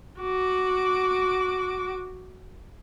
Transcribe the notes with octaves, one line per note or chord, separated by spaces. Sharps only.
F#4 D6